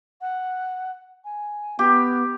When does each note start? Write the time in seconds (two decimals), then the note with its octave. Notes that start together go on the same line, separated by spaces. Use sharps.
0.21 F#5
1.24 G#5
1.79 B3 G4